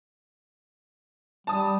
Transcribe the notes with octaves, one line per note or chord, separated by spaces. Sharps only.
G3 A5 D#6